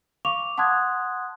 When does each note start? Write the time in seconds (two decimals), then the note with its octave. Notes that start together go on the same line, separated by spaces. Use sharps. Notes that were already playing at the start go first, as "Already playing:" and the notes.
0.25 F5 C#6 D6 F7
0.58 F#5 A5 C6 D#6 F#6 G#6